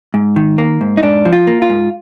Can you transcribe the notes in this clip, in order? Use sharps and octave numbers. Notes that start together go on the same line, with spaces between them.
G#2
D#3
A#3
G#2
D#4
G#2 D4
F3
F4
A#3
F4
G#2